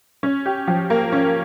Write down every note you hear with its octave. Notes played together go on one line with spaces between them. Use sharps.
C#4
G4
F3
A#3
C#4